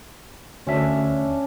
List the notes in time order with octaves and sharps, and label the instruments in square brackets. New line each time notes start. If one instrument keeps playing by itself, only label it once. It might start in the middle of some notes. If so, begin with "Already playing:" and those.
[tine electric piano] D2 E5 [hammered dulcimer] C#4 D4